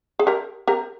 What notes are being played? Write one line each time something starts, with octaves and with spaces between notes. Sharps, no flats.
G#4
G4 A#4
G4 A#4